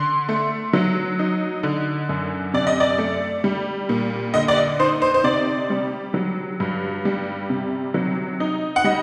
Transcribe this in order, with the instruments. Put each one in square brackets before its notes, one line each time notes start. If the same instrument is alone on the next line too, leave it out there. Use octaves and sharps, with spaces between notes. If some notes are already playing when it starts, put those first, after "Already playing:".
Already playing: [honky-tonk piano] D3 C6
A3
F#3
D#4
D3
F#2
C3 D5
D#5
D5
A3
G3
A#2
D3 D#5
D5
D#5
D#4 C5
C5
C5
C3 D5
G3
F#3
G2
G3
C3
F#3
D#4
F#5
G3 D#5